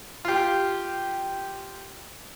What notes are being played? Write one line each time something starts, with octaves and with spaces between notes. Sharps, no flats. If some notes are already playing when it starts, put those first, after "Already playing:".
F4 G4